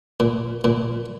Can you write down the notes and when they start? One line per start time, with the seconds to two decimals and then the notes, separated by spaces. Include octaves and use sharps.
0.20 A#2
0.64 A#2